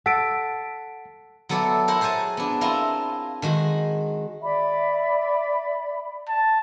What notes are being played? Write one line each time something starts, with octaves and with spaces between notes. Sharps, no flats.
A4 F#5 B6 D7
F#3 B3 A4 C#5 D5 E5
E4 A#4 C5 C#5 F#5
G#4 C5 C#5 G#5 A5
B3 D4
C4 E4 F4 A#4 G#5
D#3 G#3 F#4
D5 E5 B5
A5